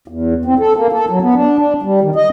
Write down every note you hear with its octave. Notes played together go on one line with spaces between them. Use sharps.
E2
C4
A4
A#3
A4
F#3
B3
D4
D4
G3
D#3
D#5